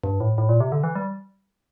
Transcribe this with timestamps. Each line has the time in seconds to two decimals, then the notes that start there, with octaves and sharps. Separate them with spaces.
0.04 G2
0.20 A2
0.38 A2
0.49 A#2
0.60 C3
0.72 D3
0.83 E3
0.95 G3